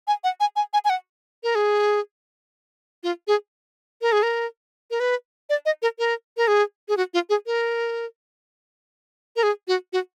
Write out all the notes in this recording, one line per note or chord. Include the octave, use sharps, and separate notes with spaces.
G#5
F#5
G#5
G#5
G#5
G#5
F#5
A#4
G#4
F4
G#4
A#4
G#4
A#4
A#4
B4
D5
D#5
A#4
A#4
A#4
G#4
G#4
F#4
F4
G#4
A#4
A#4
G#4
F#4
F#4